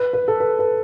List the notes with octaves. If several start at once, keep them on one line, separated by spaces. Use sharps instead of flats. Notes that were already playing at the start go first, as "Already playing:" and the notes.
Already playing: B4
B4
A4
B4
B4